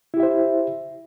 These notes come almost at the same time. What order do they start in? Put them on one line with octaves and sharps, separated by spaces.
E4 G4 E5 C5